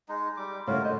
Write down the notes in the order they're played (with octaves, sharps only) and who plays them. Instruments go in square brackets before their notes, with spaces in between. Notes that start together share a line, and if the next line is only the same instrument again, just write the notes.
[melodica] G#3 D#4
G3 D6
[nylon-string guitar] A2 C#3 G3 [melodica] F4 F#4 A#4
[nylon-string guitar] D3 D#5 [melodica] C5